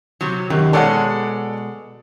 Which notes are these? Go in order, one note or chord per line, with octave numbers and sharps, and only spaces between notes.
C3 F#3
F#2 C3 D#3
B2 G#3 A4 C#5 D5 F#5